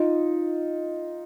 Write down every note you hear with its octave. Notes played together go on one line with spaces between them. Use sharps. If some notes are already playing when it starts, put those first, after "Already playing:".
Already playing: D#4 F4